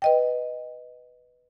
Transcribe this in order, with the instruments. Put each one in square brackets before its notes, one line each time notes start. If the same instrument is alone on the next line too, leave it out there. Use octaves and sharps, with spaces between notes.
[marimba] B4 D#5 G5